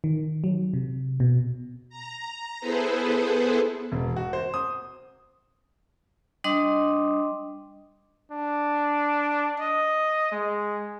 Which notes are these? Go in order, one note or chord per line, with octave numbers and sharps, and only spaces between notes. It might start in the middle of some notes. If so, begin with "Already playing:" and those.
D#3
F#3
C3
B2
A#5
B3 E4 G#4 A4 B4 C5
E1
F#4
C5
D#6
G3 D4 D#5 C6 D6 D#6
D4
D#5
G#3